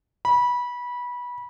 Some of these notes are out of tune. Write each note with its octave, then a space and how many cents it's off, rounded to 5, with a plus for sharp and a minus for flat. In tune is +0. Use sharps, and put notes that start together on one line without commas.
B5 -20